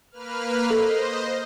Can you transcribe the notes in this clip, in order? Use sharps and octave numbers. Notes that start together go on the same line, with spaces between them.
A#3 B4 F6
A4 C5 D#5